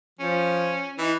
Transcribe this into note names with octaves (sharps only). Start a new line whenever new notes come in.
F3 C#4
E3 D#4